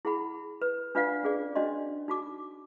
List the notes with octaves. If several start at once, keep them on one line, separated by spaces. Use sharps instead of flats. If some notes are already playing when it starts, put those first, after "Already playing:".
E4 G#4 F#5 B5
B4
D4 F4 B4 D5 F5 F#5
C#4 G#4 D5
C#4 D4 F#4 D5 D#5 C6
D#4 F#4 D6